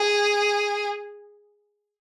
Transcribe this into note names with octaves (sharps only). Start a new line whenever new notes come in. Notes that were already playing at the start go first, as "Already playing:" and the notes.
Already playing: G#4